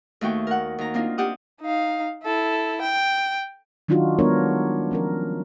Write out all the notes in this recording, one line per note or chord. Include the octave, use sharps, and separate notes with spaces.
D#2 A3 F#4 G5
A#4 F#5
D#2 A#5
A#3 C4 D4 D#4 F4
D4 G4 F#5 D#6
D#4 F5
E4 A4
G5
D#3 F#3 D4 D#4 F4 F#4
G3 G#3 B3 D4 A#4 C#5
F3 C#4 A#4